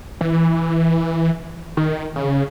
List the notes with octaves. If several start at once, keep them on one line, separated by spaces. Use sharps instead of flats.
E3
D#3
C#3